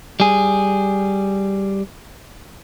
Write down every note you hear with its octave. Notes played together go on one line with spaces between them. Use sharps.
G3 G#4